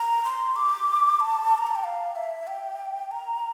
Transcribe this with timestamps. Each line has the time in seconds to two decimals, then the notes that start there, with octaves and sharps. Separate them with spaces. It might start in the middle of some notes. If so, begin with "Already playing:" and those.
Already playing: A#5
0.25 C6
0.56 D6
1.20 A5
1.58 A#5
1.67 A5
1.75 G5
1.84 F5
2.16 E5
2.47 G5
3.11 A#5